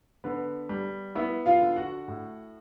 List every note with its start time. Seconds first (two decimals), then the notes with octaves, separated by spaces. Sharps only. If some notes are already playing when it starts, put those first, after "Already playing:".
0.24 D3 B3 B4
0.69 G3
1.15 B3 E4 E5
1.46 F4 F5
1.61 D3
1.76 F#4 F#5
2.08 A2